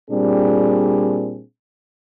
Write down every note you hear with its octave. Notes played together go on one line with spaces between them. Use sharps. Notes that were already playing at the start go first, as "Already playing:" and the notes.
A#2 G3 C4 D4 G#4